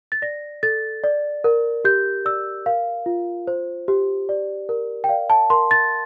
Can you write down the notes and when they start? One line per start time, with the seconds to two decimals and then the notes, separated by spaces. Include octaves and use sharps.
0.12 A6
0.22 D5 A#6
0.63 A4 A6
1.04 D5
1.44 A#4
1.85 G4 G6
2.25 D5 E6
2.66 A#4 F5
3.06 F4
3.47 C5
3.88 G4
4.29 D5
4.69 A#4
5.04 G5
5.09 D5 F5
5.30 A5
5.50 A#4 C6
5.71 A6